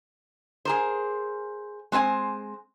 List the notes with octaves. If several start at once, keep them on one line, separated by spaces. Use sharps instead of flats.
G#4 A#4 C5
G#3 C4 C5 G#5